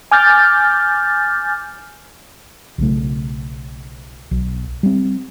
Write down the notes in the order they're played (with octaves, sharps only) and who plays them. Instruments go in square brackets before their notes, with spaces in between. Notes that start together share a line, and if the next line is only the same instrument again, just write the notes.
[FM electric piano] G#5 D6 F6 G6 A6
[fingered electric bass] B1 C#3 A3
B1
G3 C4